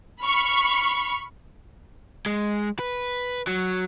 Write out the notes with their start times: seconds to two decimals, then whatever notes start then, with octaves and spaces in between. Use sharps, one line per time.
0.23 B5 C#6 F6
2.26 G#3
2.79 B4
3.47 F#3